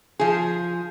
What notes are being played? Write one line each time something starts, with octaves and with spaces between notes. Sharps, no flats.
F3 G#4